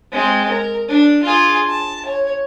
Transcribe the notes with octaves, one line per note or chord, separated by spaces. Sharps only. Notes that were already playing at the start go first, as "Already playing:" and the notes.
G#3 C4
A#4
D4
F4 G#4
A5
C#5